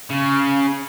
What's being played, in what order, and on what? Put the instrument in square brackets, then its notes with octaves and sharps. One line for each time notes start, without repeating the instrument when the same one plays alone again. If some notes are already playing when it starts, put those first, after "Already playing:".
[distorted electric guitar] C#3